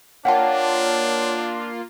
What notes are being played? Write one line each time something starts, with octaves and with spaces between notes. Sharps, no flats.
A#3 D4 F4 C#5 F#5 G5 A5